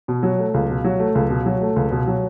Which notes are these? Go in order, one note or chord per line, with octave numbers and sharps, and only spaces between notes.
B2
F#3
A3
C#2
B2
F#3
A3
C#2
B2
F#3
A3
C#2
B2
F#3